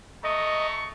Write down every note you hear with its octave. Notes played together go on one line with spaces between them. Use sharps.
A3 D#5 A#5 C#6